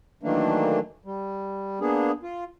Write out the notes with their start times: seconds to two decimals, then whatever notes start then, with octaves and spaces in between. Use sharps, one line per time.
0.23 D#3 E3 F#3 A3 A#3 D4
1.05 G3
1.80 A#3 B3 D4 G#4
2.23 F4